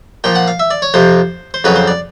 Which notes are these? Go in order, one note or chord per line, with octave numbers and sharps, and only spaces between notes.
A#2 F3 G5
F#5
F5
E5
D5
C#5
F2 C3 F3 C5
C5
F2 C#3 F#3 B4
C5
D5